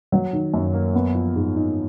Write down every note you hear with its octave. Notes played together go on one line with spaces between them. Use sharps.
F#3
D#3
F#2
A#3
B3
F3
G#2
D#4